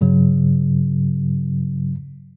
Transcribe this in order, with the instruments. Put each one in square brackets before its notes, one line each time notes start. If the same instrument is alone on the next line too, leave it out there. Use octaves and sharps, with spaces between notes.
[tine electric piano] G2 C#3 F#3